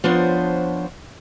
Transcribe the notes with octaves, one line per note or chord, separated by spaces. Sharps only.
F3 B3 D4 C5 C#5